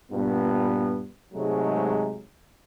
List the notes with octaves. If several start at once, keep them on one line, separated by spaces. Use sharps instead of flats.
G2 A#2 B3
G#2 C3 F#3 G#3 A3